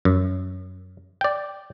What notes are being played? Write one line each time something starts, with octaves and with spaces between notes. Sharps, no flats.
F#2
D5 G5